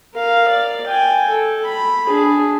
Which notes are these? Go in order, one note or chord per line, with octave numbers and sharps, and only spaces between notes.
A#4 F5
D5
G5 G#5
A4
B5
D4 G#4